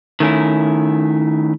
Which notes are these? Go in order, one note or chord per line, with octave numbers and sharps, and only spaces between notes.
D#3 A3 C#4 E4